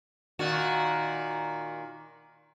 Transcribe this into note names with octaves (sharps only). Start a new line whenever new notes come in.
A#2 D#3 F#4